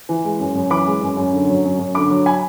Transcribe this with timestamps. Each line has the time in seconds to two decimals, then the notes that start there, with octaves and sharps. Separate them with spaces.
0.09 E3
0.25 G#3
0.40 F#2
0.55 F#2
0.71 E3 B5 D6
0.86 G#3
1.02 F#2
1.17 F#2
1.33 D3
1.49 F#3
1.65 F#2
1.79 F#2
1.95 D3 B5 D6
2.10 F#3
2.26 G#5 B5